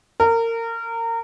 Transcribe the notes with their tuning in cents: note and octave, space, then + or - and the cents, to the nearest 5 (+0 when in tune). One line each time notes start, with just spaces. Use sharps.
A#4 -25